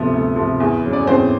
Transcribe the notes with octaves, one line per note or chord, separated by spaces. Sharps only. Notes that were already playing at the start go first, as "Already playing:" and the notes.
Already playing: D2 C3 F3 B3
D2
C3 F3
E2
C#3 F#3
D5
C#5
E2 C4 C5